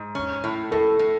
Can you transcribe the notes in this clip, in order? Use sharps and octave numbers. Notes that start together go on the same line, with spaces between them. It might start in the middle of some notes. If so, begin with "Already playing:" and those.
Already playing: G#2
C#4
A2
A2 A4
A2